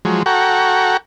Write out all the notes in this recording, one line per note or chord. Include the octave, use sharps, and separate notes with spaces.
F3 F#3 G#3
F#4 A4 F#5 G5 A#5 C#6